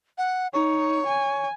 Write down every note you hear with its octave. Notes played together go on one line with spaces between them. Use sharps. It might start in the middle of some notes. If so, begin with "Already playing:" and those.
F#5
D#4 C#5
G#5